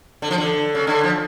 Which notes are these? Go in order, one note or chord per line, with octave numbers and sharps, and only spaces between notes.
D3
F3
D3
C#3
D3
F3